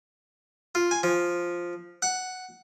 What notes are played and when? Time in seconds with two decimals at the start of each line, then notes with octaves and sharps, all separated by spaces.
0.75 F4
0.91 G#5
1.03 F3
2.02 F#5